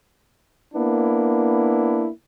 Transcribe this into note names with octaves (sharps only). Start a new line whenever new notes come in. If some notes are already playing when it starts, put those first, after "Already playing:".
A#3 B3 D4 E4